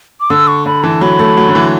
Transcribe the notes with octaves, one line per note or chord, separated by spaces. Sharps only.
D6
D3 E6
C#6
D3 B5
E3 A5
F#3 B5
A3
F#3
D3
E3